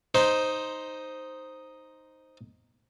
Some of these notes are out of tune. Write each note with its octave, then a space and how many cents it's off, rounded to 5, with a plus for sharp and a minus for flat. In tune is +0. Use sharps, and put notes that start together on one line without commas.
D#4 +0 C5 +0